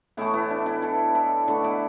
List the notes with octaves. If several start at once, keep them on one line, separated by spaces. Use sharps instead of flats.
A2 E3 A3 B3 E4
B3 E4
D4
B3 E4
E4 A4
E4 A4
D3 A3 E4 A4
B3 E4